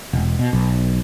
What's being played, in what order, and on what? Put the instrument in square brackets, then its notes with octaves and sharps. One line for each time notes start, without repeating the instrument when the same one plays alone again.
[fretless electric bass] E1
B2
B1